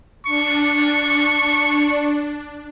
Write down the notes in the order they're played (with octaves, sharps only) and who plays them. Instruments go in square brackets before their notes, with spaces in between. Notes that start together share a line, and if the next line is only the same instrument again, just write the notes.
[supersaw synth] D4 [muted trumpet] C#6